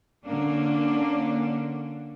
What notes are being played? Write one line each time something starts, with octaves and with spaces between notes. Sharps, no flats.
D3 A#3 C#4 D4